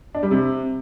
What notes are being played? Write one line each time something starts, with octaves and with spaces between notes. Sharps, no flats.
D4
G3
C3